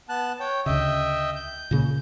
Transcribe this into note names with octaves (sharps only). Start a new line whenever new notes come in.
B3 A5 F#6
C#5 G5
D2 C#3 D#5 E5 G5
G6
A#2 C#3 A#3